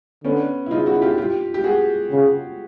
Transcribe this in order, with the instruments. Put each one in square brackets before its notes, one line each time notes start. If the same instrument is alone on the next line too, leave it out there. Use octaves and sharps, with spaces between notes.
[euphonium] D3 [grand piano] B3 C#4
[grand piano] E4
[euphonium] C#3 [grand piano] D#4 F4
[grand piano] E4 F#4
F4 G4
F4 G4
G4
F#4 G#4
[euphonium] C#3